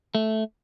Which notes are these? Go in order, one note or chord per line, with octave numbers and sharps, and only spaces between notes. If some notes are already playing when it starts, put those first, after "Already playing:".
A3